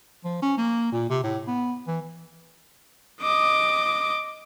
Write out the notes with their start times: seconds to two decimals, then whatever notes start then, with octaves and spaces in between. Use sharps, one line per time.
0.24 F3
0.42 C#4
0.57 A#3
0.92 A#2
1.10 C3
1.23 A2
1.47 B3
1.87 E3
3.21 D#5 D6